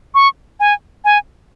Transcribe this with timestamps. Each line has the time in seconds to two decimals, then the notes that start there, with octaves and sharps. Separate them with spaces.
0.15 C#6
0.60 G#5
1.05 G#5